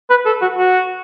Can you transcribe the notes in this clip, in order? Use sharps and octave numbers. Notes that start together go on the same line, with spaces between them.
B4
A4
F#4
F#4